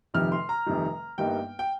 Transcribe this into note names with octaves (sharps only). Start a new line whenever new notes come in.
F1 F2 C3 D#3 G3 F6
C6
A#5
F1 F2 C3 D#3 G3
G1 G2 G3 A#3 D#4 G5
G5